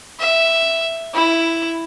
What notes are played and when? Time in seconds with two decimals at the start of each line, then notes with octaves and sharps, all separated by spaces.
0.20 E5
1.14 E4